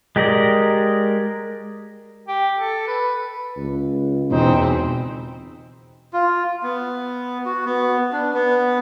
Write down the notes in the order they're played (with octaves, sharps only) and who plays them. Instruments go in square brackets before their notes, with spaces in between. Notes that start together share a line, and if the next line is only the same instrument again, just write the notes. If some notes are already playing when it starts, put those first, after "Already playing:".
[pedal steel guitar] G#3 G4 A#4 D5 D#5
[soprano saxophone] G4
A4
B4
[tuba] C#2
[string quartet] E2 C4 [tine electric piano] B2 [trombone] D#4
[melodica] F4
B3
F#4
B3
D4
B3